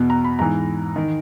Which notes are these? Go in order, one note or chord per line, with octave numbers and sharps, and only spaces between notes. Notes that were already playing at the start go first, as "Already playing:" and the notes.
Already playing: E2 B2
A#5
B5
G#2 E3 A#5
D#3